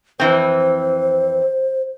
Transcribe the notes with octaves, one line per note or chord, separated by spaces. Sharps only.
F2 E3 C4 C5